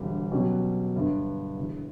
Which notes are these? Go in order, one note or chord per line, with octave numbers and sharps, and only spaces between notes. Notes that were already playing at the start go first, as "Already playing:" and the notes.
Already playing: E1 D2 D3 G3
B2 F#3 C#4 G4
G1 G2 D3
E1 E2 D3